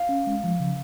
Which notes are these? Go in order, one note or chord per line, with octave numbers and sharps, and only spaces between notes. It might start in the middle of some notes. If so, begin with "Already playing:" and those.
Already playing: F5
C#4
G#3
F3
C#3